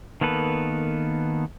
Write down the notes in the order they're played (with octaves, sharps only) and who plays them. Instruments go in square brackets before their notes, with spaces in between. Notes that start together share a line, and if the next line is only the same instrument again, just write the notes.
[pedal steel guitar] D#3 A#3 B3 A4 B4